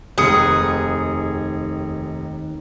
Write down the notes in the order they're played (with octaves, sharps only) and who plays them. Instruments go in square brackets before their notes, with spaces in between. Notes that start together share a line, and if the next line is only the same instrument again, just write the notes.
[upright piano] F1 D#6 C#7 [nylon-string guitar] D#2 D#3 B4 [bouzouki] G#4